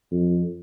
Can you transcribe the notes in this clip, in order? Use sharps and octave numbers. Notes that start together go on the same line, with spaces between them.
F2